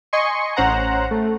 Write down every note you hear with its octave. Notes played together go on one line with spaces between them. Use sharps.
D#5 G#5 C6 C#6 C#7
A1 C#4 C5 F#5 A#5
A3